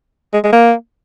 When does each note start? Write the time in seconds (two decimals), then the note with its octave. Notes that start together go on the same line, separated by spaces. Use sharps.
0.34 G#3
0.44 G#3
0.53 A#3